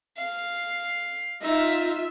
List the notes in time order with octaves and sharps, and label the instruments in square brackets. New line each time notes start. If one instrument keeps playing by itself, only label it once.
[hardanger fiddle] F5
[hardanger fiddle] D#4 [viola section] F4 E5